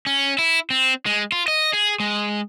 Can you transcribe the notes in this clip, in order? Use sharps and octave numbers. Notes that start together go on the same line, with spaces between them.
C#4
E4
C4
G#3
F4
D#5
G#4
G#3